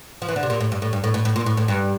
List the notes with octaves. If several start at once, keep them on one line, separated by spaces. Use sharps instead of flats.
F3
E3
D3
C3
A#2
A2
G2
A2
G2
A2
A2
A2
A#2
A2
A2
G2